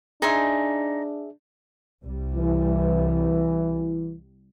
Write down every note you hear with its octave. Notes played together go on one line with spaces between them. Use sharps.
D4 D#4 G#4 E5 G#5 C6
C2 G3
E3